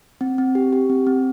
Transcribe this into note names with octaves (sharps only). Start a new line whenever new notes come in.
C4
C4
G4
G4
C4
C4